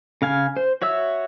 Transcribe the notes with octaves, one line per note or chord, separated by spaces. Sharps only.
C#3 F5 G#5
C5
F#4 C#5 E5 E6